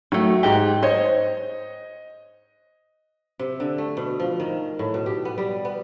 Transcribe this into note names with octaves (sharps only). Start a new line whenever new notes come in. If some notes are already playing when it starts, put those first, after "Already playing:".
D#3 F#3 A3
G#2 G4
C5 C#5 D#5
C3
D3
A3
B2
F3
D#3
A2
B2
G4
B3
G3
B3